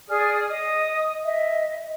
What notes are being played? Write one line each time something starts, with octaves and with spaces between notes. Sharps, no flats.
G#4 D5 D#6 F6
D#5 D#6
D#5 E5